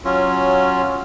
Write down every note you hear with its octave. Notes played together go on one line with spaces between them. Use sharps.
F#3 C#4 F4